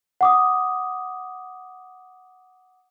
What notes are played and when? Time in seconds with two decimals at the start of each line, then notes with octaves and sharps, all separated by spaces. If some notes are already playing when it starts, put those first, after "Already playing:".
0.21 F#5 D6 D#6